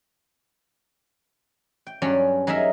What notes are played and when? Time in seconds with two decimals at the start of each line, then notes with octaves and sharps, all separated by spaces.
1.87 G5
2.02 G2 F#3 C#4 D5
2.47 F#3 D#4 G#4 A#4 E5